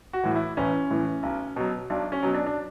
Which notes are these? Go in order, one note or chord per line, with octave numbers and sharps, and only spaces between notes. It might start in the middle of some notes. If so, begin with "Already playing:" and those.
F#4
A2 E3
E4
A1 C#4
A2 E3
B1
B2 F#3
B1 D4
C#4
B2 F#3
D4
D4